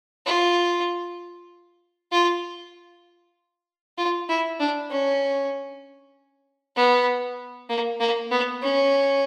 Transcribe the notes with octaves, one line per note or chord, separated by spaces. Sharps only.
F4
F4
F4
E4
D4
C#4
B3
A#3
A#3
B3
C#4